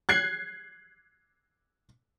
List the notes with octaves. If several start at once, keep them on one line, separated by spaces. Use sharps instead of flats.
F#6 G#6 C7